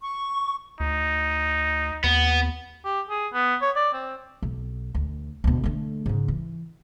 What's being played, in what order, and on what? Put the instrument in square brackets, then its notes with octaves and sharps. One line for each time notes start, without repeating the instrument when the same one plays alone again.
[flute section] C#6
[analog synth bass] D2 [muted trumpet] D#4
[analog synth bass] D#2 [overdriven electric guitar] B3
[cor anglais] G4
G#4
B3
C#5
D5
C4
[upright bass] B1
D2
D2 B2
D3 A3
G#2 C#3
E3